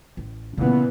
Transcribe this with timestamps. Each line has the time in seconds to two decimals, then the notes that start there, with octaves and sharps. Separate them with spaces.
0.17 A1
0.57 A#2 C#3 E3 B3 C#4